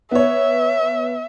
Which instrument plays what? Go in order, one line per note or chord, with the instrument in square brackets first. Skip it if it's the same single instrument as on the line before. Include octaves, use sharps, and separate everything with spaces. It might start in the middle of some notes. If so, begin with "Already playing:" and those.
[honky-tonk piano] B3 C#5 [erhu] E5